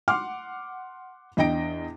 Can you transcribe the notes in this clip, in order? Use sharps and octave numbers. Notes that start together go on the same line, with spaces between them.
F#5 C6 D6 F6
E2 D4 D#5 G5 A#6 D7